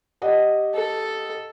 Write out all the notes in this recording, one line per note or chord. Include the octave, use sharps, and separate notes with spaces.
G4 D#5 F#5
A4